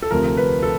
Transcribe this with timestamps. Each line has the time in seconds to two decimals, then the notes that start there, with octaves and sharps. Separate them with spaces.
0.02 A4
0.11 D2 C3 F3 A#4
0.37 B4
0.63 A4